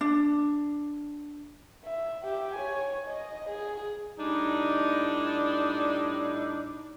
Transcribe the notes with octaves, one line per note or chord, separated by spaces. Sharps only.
D4
E5
G4 E5
C#5 G#5
D#5
G#4
A2 G3 D4 D#4